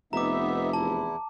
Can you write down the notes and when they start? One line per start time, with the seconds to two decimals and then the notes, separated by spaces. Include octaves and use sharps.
0.13 F1 B3 D#4 E5 A#5 D6
0.73 E2 E4 A5